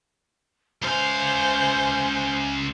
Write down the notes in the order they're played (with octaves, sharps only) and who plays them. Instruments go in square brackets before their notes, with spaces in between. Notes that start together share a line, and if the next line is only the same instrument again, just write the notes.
[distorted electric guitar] C#2 F5 [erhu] C5 [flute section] E5 G#5 F6